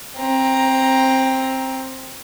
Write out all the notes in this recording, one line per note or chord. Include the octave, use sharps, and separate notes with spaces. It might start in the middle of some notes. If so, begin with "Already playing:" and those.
C4 A#5